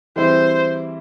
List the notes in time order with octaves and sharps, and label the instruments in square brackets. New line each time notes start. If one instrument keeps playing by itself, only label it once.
[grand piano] E3 G3 C4 E4 G#4 [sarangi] C5